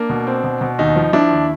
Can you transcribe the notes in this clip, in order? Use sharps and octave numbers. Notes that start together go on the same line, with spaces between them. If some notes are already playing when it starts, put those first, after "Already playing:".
Already playing: A#3 D4
B2
C4
B2
B2
D#2 D#4
F3
F3 D4 E4
D#2